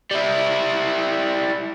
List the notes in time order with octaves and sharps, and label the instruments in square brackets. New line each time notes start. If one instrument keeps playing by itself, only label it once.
[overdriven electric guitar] G3 E4